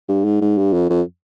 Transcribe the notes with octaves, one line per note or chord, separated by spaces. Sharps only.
G2
G#2
G#2
G2
F2
F2